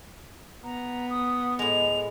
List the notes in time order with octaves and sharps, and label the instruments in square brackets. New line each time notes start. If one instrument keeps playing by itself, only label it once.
[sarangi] B3 [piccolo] A#5
[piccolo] D#6
[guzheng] A2 G#3 [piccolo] F7